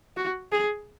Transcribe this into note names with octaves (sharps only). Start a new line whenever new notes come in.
F#4
G#4